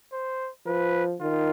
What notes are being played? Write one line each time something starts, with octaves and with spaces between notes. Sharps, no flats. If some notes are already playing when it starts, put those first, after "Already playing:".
C5
F3 B4
D#3 F4